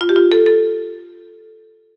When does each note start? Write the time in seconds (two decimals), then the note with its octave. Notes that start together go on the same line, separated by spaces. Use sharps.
0.01 F4
0.09 G4
0.16 F4
0.32 A4
0.46 A4